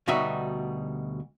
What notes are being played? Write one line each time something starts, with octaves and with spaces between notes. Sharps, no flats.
D2 B2 G3 D#4 F#4 E5